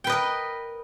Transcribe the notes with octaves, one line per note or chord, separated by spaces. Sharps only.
A#4 B4 D#5 G5